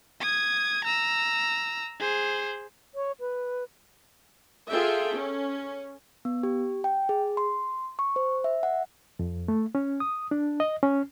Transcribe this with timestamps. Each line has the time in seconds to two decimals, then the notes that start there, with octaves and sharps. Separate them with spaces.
0.21 D#6 G#6
0.84 A#5 E6
2.00 G#4 C5
2.95 C#5
3.20 B4
4.69 F4 G#4 A4 E5 G5
5.15 C#4
6.25 B3
6.43 G4
6.84 G5
7.09 G#4
7.37 C6
7.99 C#6
8.16 C5
8.44 E5
8.63 F#5
9.19 F2
9.48 A3
9.75 C#4
10.00 D#6
10.31 D4
10.60 D#5
10.83 C#4